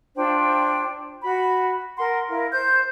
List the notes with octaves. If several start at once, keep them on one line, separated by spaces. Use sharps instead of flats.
D4 F4 C5 G5
F#4 B5
A#4 F#5 C6
E4 A#4 F5
C5 G6